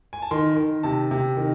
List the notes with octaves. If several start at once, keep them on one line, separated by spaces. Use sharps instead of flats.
G#5
A5
D#3 C6
D#3
C3 A5
C3
D#3